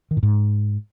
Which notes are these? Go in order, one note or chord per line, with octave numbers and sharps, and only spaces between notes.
D#3
A2
G#2